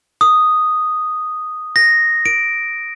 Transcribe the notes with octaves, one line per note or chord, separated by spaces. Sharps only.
D#6
A#6
D7